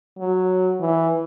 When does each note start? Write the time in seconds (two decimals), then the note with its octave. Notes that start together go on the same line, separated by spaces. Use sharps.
0.19 F#3
0.80 E3